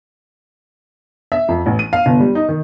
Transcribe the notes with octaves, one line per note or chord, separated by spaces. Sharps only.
E5
F2
A1
D#7
F5
G1
G3
D#4
D#3